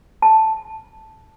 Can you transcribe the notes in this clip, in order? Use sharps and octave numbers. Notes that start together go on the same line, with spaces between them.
A5